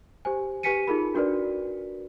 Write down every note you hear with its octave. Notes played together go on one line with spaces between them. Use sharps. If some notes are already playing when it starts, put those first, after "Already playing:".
G4 C5 G#5
G4 B4 G#5 B6 C#7 D#7
D#4 F4 G#4 A#4 B5
D4 F#4 A#4 B4 D5